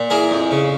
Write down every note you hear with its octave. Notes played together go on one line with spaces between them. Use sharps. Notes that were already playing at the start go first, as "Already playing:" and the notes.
Already playing: A#2
E3 G#4 A#4
F2
C#3